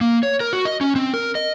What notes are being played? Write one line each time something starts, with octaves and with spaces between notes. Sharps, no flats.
A#3
C#5
A#4
F#4
D#5
C#4
C4
A#4
D#5